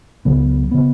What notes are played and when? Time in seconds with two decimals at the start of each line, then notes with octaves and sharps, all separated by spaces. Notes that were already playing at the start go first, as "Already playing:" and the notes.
0.25 C#2 C#3 F#3 B3
0.71 C#3 B3